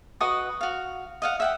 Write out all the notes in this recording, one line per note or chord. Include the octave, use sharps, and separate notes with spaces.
F#4 B4 D#5 D#6
F#4 F5
D#5 F5 F#5
E5 F#5 G5